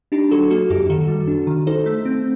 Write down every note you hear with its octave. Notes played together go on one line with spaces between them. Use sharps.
D4 D#4 G4
F#3 F#4 A4
A#3 F#4 A4
F#2 D#4 G4
D#3 F#4 A4
G3
D4
D#3
D#4 A4 C5
A3
C4